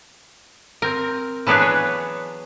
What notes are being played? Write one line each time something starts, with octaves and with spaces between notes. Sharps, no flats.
C4 A#4
E3 F#3 B3 D4 G#4 B4
C#5